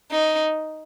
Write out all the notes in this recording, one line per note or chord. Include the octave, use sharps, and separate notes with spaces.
D#4